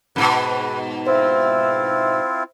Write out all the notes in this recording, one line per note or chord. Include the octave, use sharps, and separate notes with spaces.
F2 G#2 B2 B4
C4 E4 F4 C5 E5